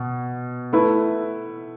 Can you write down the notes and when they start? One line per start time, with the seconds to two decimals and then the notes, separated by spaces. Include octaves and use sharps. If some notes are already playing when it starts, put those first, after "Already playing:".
Already playing: B2
0.73 A3 E4 B4